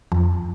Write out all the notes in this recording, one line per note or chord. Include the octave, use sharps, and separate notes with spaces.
F2